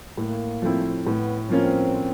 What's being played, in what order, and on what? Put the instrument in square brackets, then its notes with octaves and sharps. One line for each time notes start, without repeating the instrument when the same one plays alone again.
[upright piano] A2 [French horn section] A#3
[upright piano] F3 A3 C4 E4
[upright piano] A2 [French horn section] B3
[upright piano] F3 A#3 C#4 F4 [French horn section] C4